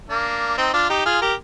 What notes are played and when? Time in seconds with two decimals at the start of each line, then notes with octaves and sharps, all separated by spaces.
0.09 A#3 D4
0.57 C4 D#4
0.73 D4 F4
0.89 D#4 G4
1.05 F4 G#4
1.22 G4 A#4